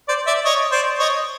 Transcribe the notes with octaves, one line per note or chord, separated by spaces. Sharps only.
C5 D5
D5 E5
C#5 D#5
C5 D5
C#5 D#5